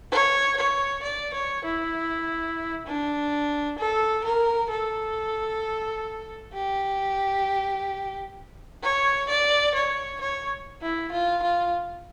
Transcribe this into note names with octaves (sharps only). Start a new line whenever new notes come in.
C#5
C#5
D5
C#5
E4
D4
A4
A#4
A4
G4
C#5
D5
C#5
C#5
E4
F4
F4